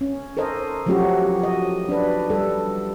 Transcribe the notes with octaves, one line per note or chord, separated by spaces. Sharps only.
C#4
A4 A#4 C5 D#5
F3 F#3 A3 C#4 F#4 G4
D#5
D4 B4
G3 A4